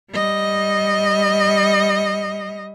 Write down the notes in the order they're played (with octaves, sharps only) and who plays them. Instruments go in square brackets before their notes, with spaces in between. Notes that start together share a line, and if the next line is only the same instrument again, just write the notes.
[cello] G3 D#5